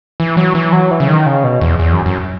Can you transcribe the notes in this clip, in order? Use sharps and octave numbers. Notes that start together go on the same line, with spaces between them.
E3
F#3
E3
F#3
E3
C#3
D#3
C#3
B2
E2
E2
F#2
F#2